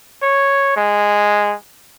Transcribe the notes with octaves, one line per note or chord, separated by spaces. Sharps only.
C#5
G#3